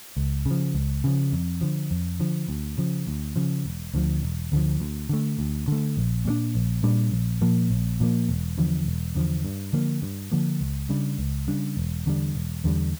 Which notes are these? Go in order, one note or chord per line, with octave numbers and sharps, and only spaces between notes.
C#2
C#3 F3
C#2
C#3 F3
F2
D3 F3
F2
D3 F3
D2
C#3 F3
D2
C#3 F3
E1
D2 D3 F3
E1
D2 D3 F3
D2
D3 A3
D2
D3 A3
A#1
A#2 G3 D4
A#1
A#2 G3 D4
A#1
A#2 F3 A#3
A#1
A#2 F3 A#3
E1
E2 D3 F3
E1
E2 D3 F3
G2
D3 F3 A#3
G2
D3 F3 A#3
C#2
C#3 G3 D4
C#2
C#3 G3 D4
E1
E2 D3 G3
E1
E2 D3 G3